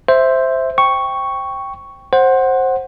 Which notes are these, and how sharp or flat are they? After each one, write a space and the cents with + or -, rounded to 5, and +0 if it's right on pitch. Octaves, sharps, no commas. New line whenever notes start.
C5 +0 E5 +0
G5 +0 C#6 +0
C5 +15 F#5 +0